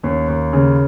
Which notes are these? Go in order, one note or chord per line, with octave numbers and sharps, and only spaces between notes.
D#2 C#4
D#2
C#3